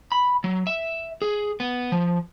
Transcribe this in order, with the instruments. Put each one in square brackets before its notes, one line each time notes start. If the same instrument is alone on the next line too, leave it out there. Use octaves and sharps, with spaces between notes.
[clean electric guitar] B5
F#3
E5
G#4
B3
F3